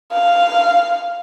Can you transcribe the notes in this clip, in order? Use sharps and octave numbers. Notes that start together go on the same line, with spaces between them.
F5